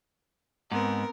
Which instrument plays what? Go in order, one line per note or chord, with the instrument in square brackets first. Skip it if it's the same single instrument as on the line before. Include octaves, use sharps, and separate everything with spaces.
[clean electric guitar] G#2 [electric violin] B3 C4 [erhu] A#4